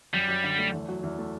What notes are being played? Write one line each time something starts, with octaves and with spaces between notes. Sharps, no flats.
F#2 G3
F#2
D3
A3
E2
F#3
E2
A3